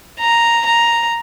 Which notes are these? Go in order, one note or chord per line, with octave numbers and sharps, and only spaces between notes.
A#5
A#5